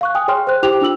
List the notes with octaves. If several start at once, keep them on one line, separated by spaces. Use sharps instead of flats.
F5 C#6 F#6
G5 G#5 D#6
G#4 C#5 G5 C6 F6
C5 F#6
E4 G4 C5 G5 D6 F7
D4 F4 E6 F#7